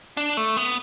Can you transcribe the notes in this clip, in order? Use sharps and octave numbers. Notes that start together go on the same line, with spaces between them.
D4
A3
B3